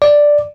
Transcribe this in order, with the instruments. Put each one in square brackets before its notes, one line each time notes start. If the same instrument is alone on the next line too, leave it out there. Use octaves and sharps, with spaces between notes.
[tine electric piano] D5